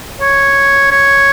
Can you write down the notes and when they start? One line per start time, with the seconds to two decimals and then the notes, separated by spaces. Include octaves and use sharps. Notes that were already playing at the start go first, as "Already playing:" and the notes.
0.21 C#5
0.91 C#5